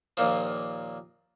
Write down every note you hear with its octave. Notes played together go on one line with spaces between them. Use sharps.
D#2 A#2 F3